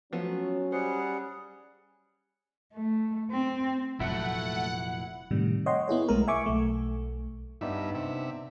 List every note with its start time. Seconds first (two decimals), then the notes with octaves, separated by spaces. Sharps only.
0.13 F3 F#3 A3 B3 C#4
0.72 G3 G#4 C5 F#5
2.74 A3
3.31 C4
4.00 F1 A#2 F#3 A3 E4 A4 F#5
5.31 A2 C3 D#3 G3
5.66 C#5 D#5 F#5 G5 C6
5.88 B3 E4 G#4 C#5
6.08 B1 B2 G#3 A3 A#4
6.28 E5 G#5 C#6 D6
6.46 B1 A3
7.61 G2 B3 D4 D#4 E5
7.95 C3 E5